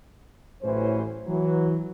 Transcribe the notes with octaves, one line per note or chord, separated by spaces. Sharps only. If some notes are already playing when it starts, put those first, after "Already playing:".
A1 A2 E3 F#3 C#4 C5
E3 F#3